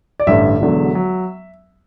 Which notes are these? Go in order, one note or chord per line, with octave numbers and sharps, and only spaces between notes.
D5
A1 G2 D3 E5
E1 E2 D3 F#3
F#3